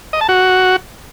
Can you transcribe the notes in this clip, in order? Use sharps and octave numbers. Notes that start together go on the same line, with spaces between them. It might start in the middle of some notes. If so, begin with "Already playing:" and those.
D#5
A5
F#4